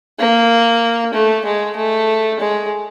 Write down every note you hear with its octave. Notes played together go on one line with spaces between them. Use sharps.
A#3
A3
G#3
A3
G#3